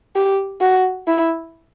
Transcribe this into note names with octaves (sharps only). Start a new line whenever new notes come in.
G4
F#4
E4